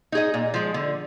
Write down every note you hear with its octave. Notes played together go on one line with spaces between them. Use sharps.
D#4 G#4 D#5
A#2
F3 G#3
D3